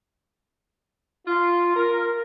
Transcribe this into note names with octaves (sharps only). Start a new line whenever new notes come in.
F4
A#4